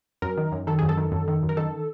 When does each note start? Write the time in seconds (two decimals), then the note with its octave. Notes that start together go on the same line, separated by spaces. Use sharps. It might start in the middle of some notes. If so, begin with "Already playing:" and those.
0.22 F#2 A#4
0.37 D#3
0.52 F#2
0.67 D#3 A4
0.79 F#2 G#4
0.89 A4
0.97 D#3
1.12 F#2
1.28 D#3
1.43 F#2
1.49 A#4
1.57 D#3 A4